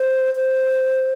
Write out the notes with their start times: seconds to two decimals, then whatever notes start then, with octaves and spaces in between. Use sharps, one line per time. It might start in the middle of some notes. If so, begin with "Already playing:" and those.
Already playing: C5
0.36 C5